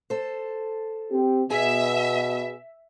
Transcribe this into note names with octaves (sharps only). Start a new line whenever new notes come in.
A4 C5
C4 G4
B2 G#4 E5 G#5